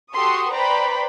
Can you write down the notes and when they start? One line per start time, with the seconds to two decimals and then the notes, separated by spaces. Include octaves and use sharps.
0.12 F#4 G4 A4 C6 C#6 D#6
0.50 B4 C5 D5 G5 A#5 B5